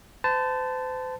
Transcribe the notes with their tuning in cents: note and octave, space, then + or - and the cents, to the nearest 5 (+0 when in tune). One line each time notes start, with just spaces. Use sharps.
C5 -40 A5 +0